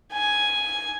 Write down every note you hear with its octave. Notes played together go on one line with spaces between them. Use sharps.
G#5